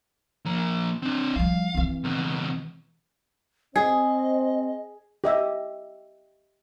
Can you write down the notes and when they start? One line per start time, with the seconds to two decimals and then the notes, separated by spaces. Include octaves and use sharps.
0.45 F3 A#3
1.03 C4 D4
1.36 F3 G3 F5
1.75 E3 C4
2.04 C#2 B2
3.76 C4 G#4 C5 D#5
5.24 G4 D#5 E5